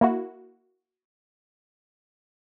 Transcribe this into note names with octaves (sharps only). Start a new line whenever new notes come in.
A#3 E4 F#4